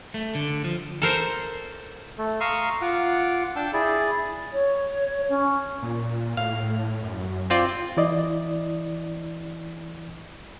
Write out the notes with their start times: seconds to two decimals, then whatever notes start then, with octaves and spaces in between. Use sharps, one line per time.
0.14 A3
0.35 D3
0.64 F3
1.02 A4 A#4 C5
2.18 A3
2.40 F5 A#5 C6 C#6 D#6 E6
2.82 F4 F#5 D6
3.56 D4 G5 A5 E6
3.74 E4 G#4 D5
4.53 C#5
5.29 C#4
5.82 A#2
6.37 A2 F5
7.02 F#2
7.50 C4 F4 D5
7.97 E3 E4 D5 D#5